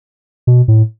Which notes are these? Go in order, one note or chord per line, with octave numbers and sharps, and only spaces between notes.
B2
A2